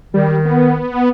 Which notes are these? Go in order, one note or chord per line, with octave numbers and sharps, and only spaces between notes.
D#3 G3
B3